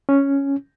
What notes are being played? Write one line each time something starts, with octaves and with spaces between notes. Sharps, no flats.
C#4